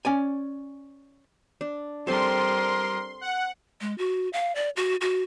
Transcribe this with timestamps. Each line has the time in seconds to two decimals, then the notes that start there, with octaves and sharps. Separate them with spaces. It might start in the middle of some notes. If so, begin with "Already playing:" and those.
0.05 C#4 D5 G#5
1.61 D4
2.07 G3 C4 A4 A#4 C6
3.21 F#5
3.81 G#3
3.98 F#4
4.33 F5
4.55 D5
4.76 F#4
5.01 F#4